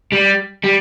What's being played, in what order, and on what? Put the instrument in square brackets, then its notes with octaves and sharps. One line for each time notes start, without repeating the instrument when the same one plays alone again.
[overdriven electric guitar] G3
G3